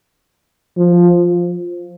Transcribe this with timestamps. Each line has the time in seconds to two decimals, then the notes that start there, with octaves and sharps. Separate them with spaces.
0.77 F3